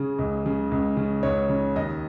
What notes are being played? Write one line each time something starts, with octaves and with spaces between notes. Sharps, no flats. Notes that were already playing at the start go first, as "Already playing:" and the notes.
Already playing: C#3 G#4
C#2
C#3
C#2
C#3
C#2 C#5
C#3
D#2 D#5